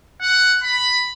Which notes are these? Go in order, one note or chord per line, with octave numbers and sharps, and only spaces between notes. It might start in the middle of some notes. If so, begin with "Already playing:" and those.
F#5
B5